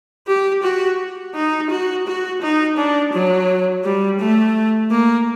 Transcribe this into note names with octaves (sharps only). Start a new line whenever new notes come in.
G4
F#4
D#4
F#4
F#4
D#4
D4
F#3
G3
A3
A#3